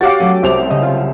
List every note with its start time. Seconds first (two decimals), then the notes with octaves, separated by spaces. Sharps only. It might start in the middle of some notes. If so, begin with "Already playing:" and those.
0.01 F#4 G4 C#5 F5 F#5 D6 A6
0.20 F#3 A3 C#4
0.43 C2 C5 F7
0.70 C#3 D#5
0.83 F4